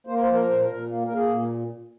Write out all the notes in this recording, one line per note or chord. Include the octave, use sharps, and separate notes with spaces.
A#3 C5
A#4
C5
F3
A#4
A#2 C5
A#4
A#2
A#3
A#3 A#4
G#4
A#2